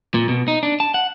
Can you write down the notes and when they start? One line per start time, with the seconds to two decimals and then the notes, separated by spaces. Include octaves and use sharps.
0.14 A#2
0.29 B2
0.48 D#4
0.63 D4
0.80 A5
0.94 F#5